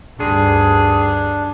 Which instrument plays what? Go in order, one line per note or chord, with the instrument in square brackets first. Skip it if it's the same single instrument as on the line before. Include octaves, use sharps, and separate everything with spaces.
[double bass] D2 G2 [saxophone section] D#3 G#4 [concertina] D4